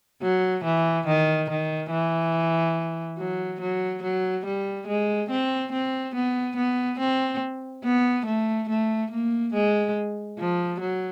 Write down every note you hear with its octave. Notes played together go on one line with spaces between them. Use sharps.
F#3
E3
D#3
D#3
E3
F#3
F#3
F#3
G3
G#3
C4
C4
B3
B3
C4
B3
A3
A3
A#3
G#3
F3
F#3